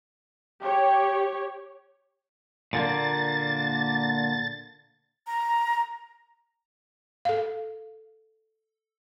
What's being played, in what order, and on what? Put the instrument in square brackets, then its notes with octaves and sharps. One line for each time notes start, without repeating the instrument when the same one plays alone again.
[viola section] G4 C#5
[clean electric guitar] A#2 D3 A#3 [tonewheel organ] A6
[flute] A#5
[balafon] A4 F5